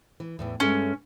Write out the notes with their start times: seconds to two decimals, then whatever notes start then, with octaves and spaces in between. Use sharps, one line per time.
0.20 E3
0.39 E2 A2 E3
0.60 G2 G#3 A3 C#4